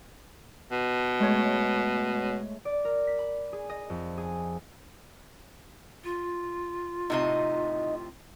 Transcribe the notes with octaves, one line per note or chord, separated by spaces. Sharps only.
B2
G#3 A3 C#5
D5
A#4
B6
B5
G#4
D#5
F2
G#4
F4
A2 C3 D#4 D#5